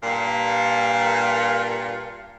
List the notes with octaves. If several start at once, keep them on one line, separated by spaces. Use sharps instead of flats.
G2 A#2